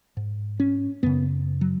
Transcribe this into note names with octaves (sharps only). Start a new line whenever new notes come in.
G#2
C#4
F#2 C#3 B3
F#3